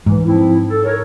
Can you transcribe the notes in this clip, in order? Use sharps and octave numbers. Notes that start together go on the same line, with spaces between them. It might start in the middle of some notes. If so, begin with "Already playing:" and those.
G#2 E3
F3 C4 E4
A4
A#4 C#5